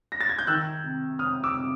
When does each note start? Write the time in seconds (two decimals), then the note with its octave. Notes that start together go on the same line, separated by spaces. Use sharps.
0.12 A#6
0.21 A6
0.29 G#6
0.39 G6
0.47 D#3 E6 F#6
0.84 C3
1.19 C3 D#6 F6
1.44 D6 E6
1.55 C3